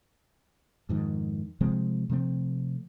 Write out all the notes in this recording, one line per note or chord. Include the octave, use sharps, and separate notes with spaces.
F2 G#2 D#3
C3 F3 G#3 C4
C3 F3 A3 C4